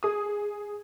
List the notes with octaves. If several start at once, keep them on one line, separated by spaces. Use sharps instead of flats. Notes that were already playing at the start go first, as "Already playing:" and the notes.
G#4 D#6